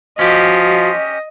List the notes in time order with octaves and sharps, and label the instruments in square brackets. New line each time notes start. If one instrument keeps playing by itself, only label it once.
[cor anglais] F3 [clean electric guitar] C#4 G4 [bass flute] F#4 [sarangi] D#5